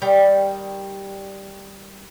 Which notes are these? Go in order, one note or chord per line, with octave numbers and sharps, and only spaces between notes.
D#3 G3 D5 G5